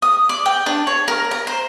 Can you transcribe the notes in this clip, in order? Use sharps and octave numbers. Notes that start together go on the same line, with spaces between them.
D#6
D5
G5
D4
C#5
A#4
A#5
C5